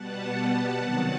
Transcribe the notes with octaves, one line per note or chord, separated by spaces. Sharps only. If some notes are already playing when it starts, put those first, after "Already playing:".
Already playing: B2 G3 B3 F#5 A5
C3 D#3 F#3